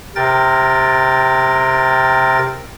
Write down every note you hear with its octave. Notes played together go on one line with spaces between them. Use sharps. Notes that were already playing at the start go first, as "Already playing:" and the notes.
C3 A#4 G5 A6